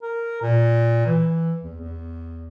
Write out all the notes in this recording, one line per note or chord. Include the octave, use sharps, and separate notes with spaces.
A#4
A#2
E3
E2
E2